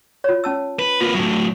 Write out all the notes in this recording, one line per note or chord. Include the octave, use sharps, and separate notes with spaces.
F4 C#5
C#4 A5 E6
B4
A#3 F4 B4
A2 F#3